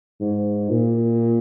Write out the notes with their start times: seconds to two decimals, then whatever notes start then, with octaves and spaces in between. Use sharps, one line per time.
0.20 G#2
0.70 A#2